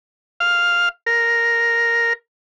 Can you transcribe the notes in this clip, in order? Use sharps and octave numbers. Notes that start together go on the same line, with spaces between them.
F5
A#4